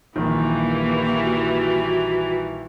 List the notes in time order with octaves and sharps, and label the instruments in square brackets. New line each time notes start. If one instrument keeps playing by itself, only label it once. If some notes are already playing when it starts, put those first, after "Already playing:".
[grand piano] A#1 D#3 [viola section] E3 G3 [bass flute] A#3
[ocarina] F#4